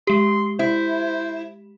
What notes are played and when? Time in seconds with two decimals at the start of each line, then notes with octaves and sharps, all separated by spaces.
0.07 G#3 G4 C6
0.59 E4 C5